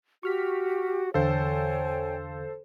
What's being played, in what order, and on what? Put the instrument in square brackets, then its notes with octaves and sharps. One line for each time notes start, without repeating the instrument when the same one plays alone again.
[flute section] F#4 G4 [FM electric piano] C#6 F6 B6
[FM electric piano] E2 D3 F5 [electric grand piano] A4 C5 [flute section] C#5 G5 G#5